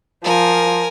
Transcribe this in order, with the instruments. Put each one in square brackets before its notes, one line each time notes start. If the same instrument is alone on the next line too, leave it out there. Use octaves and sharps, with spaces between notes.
[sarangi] F3 [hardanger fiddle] A#4 G#5